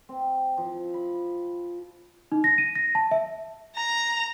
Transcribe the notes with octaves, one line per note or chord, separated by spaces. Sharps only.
C4
F3
B5
D#4
A#6
D#7
A#6
A5
E5
A#5